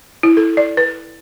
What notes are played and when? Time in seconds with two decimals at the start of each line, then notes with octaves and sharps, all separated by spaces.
0.23 E4
0.37 A4
0.57 D5
0.77 B4